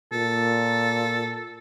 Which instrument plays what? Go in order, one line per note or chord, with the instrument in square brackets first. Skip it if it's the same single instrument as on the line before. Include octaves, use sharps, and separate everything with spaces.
[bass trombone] A#2 [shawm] A4